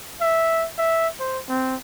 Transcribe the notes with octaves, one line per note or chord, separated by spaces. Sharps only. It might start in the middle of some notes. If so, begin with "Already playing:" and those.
E5
E5
C5
C4